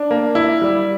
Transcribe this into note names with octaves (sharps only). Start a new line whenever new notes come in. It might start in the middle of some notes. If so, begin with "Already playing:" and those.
Already playing: D4
A#3
E4
G3